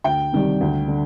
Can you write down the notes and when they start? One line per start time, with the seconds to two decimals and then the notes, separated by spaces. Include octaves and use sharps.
0.04 D2 G5
0.33 C3 D#3 G3
0.61 D2
0.88 D3